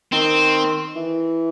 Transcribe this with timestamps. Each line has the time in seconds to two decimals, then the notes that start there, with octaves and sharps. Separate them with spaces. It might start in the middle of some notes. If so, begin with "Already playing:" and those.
0.12 D#3 C4
0.96 E3